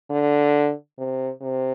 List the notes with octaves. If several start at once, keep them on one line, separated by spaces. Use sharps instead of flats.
D3
C3
C3